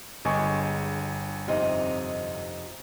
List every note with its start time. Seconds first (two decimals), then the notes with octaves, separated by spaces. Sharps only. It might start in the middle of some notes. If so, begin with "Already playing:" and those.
0.25 G1 G#3 G#5 C#6
1.48 F2 C3 D#4